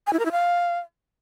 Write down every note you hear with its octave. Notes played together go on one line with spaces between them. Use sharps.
G#5
E4
A#4
E4
F5